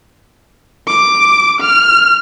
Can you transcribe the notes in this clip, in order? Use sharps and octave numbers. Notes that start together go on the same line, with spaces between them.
D6
F6